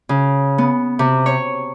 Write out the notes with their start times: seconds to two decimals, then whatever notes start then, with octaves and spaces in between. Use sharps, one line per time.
0.09 C#3
0.58 B3
0.99 C3
1.26 C#5